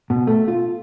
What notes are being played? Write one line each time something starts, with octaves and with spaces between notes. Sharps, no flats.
B2
A3
F4